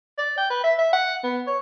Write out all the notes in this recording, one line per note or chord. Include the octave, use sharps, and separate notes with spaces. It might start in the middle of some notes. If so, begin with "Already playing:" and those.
D5
G5
B4
E5
E5
F#5
B3
C#5